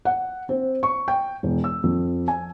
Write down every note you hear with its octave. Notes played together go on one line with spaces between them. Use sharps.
F#5
C4
C#6
G5
E1
E6
F2
G#5